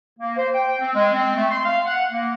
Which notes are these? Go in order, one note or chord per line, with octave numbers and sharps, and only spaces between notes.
A#3
C5
G5
C4
G#3
C4
A3
C6
F5
F#5
A#3